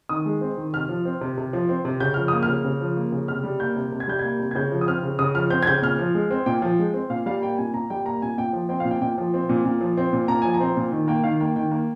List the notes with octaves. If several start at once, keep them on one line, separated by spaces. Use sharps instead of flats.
D#3 D#6
G#3
C4
D#3
C3 F6
F3
C4
C3
C3
F3
C4
C3
C#3 G6
F3 F6
A#3 D#6
F6
C#3
C#3
F3
A#3
C#3
C3 F6
G3
A#3 G6
C3
C3
G#6
G3 G6
A#3 G#6
C3
G#6
C#3 G6
F3
D#6
C4 F6
C#3
C#3 D#6
F3 F6
C4 G6
G#6
C#3 G6
A#2 F6
F3
G#3
C4
A#2 G5
F3
G#3
C4
A#2 F5
G3 F5
A#3 G5
A#2 G#5
A#2 A#5
G3 G5
A#3 A#5
A#2 G#5
A#2 G5
F3
C4 G5
A#2 F5
G5
A#2 G5
F3
C4
A#2
A#2
F3
C4
A#2
A#2 A#5
F3 G#5
A#5
C4
A#2
D#3
A#3 G5
D#3 F5
A#3 G5
D#3 G5
A#3